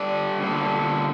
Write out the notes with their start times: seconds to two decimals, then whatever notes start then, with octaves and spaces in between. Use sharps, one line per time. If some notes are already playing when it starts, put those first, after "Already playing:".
Already playing: G3 D4 A4 D5
0.42 D3 G3 A#3